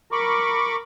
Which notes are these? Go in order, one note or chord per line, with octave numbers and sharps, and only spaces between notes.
A#4 B5 C#6 D6